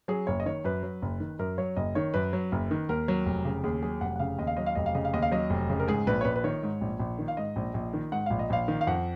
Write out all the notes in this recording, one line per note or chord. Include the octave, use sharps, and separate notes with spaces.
F#3 G#4
F#1 C#5
D#5
D#3 C#5
F#2 B4
F#3
F#1
D#3
F#2 A#4
F#3 C#5
F#1 D#5
D#3 C#5
F#2 B4
F#3
F#1
D#3
D#2 A#4
F#3
F1
C#3
D#2 G#4
F#3 G#4
F1 F#5
F#5
C#3 F5
D#2 D#5
F5
F#3 D#5
F5
F1 D#5
F5
C#3 D#5
F5
D#2 D#5
F5
F#3 D#5
F1
C#3
A#4
G#2 G#4
A#1 B4
C#5
A#1 B4
B4
D#3 C#5
G#2
A#1
A#1
D#3
F5
G#2 D#5
A#1
A#1
D#3
G#2 F#5
A#1 F5
D#5
A#1 F5
D#3
F5
F2 F#5